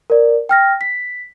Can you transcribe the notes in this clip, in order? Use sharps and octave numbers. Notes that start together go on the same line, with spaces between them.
A#4 D5
G5 F6 A#6
B6